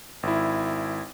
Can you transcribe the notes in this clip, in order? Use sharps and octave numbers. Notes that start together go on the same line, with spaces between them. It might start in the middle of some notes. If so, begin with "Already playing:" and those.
G#1 E4